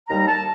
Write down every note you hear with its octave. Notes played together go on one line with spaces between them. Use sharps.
D#2 D#3 G3 A#5
A5